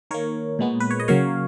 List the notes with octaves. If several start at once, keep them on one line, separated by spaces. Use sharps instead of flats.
D#3 A#3 A#4 C#5
A#2 G#3 B3
B4
C#5
D#5
C#3 F#3 A#3 C#5 F5